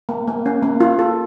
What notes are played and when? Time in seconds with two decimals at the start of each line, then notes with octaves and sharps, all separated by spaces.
0.09 A#3
0.27 A#3
0.46 C#4
0.63 A#3
0.80 F4
0.99 A4